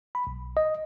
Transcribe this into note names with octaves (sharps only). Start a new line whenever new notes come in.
B5
B1
D#5